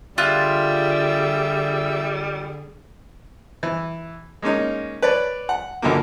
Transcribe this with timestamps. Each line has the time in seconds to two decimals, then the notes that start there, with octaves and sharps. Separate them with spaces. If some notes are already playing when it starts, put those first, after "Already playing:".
0.18 D3 G3 F4 G#4 E5 F#6
3.63 E3
4.42 G#3 A#3 C#4 D#4
5.02 B4 C#5 D5
5.49 F#5
5.82 C#2 D3 F#3 A#3